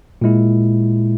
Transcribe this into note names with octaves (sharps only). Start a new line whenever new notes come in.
A#2 G#3 E4